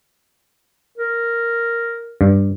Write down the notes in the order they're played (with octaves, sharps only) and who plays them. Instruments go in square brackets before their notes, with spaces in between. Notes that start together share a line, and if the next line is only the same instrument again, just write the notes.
[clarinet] A#4
[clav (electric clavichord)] G2